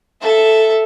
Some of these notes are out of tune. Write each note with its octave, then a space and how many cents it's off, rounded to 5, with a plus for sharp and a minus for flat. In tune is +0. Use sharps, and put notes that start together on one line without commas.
A4 +0 E5 +0